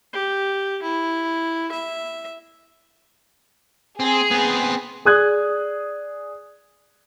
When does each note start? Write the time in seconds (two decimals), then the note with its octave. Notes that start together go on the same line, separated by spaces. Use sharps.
0.13 G4
0.83 E4
1.72 E5
4.00 C4 G#4
4.31 B3 C4
5.05 G#4 D5 D#6 F#6 G#6